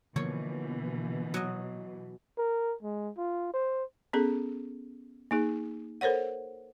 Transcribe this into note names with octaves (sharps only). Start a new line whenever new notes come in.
B2 D3 E3 F3 A#3 C#5
F#3 D#5
A#4
G#3
F4
C5
B3 C#4 G#4 A4
A#3 D#4 G#4
A4 A#4 C5 C#5 F#5